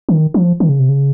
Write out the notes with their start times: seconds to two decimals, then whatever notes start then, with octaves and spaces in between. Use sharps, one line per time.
0.09 D#3
0.34 F3
0.60 D#3
0.69 C#3
0.79 C3
0.89 C#3